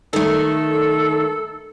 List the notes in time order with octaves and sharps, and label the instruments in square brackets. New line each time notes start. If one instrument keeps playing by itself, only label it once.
[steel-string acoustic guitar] D#3 A3 [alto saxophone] A4